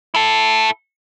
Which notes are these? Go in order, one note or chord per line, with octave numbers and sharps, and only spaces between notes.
E4 A4